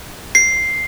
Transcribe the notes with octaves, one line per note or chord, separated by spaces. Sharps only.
C7